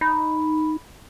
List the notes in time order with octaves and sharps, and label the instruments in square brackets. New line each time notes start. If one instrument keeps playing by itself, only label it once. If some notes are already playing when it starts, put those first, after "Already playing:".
[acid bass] D#4 [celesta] B5